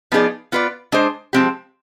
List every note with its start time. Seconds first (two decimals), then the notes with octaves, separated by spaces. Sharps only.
0.12 F3 B3 D#4 G#4 D5
0.52 B3 F4 B4 D5
0.92 G#3 D4 G#4 C5
1.33 F3 G#3 C4 G4